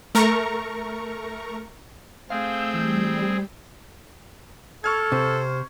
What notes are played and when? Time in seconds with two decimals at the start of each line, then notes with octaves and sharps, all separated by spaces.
0.15 A3 A#4 A#5 C#6
2.30 A3 C4 G#4 F5 E6 G6
2.74 E3 G3
4.84 A4 C#6 F6 G#6
5.12 C3 C5